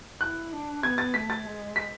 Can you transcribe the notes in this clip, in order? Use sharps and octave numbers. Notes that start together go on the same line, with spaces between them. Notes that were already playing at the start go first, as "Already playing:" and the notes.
E4 F#6
D4
B3 G#6
A6
A3 B6
A6
G#3
B6